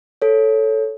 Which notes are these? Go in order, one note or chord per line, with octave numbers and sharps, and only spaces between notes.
A4 C#5